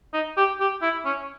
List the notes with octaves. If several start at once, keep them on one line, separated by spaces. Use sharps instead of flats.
D#4
G4
G4
E4
C#4